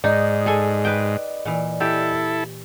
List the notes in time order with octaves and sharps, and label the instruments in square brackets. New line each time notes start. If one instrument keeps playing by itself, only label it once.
[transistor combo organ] G#2 [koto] D#4 [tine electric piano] D5 D#5
[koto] G#4 A4 G#5
B4 G5
A#2 E3
[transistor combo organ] E4 A4 [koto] G4